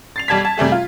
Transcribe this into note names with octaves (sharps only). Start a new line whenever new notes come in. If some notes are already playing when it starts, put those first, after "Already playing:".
A6 C7 F7
B1 G3 A5 G#6 B6
A5
C3 G3 A3 G#4
F4